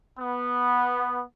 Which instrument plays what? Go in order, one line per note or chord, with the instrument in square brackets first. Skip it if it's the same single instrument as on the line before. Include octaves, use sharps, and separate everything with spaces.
[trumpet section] B3